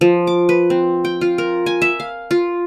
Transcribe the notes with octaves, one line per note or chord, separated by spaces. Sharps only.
F3
D6
B4
C4
G5
F4
A#4
G#5
E5
F5
F4